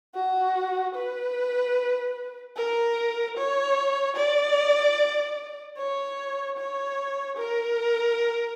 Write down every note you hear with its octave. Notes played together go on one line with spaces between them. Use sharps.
F#4
B4
A#4
C#5
D5
C#5
C#5
A#4